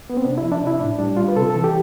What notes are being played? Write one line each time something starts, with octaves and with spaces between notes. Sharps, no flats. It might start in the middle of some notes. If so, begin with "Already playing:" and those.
B3
C4
C3 D4
E4
F3
D4
C3
E4
A2 D4
G3 D4
G3 F4
B4
C3 A4
E3 A4
G4